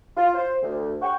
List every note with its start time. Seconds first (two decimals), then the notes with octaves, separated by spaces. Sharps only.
0.17 F4
0.35 C5
0.63 D2
1.02 F#5 G5 C#6